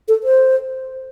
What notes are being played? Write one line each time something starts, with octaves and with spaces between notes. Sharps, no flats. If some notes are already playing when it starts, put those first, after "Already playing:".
A4
C5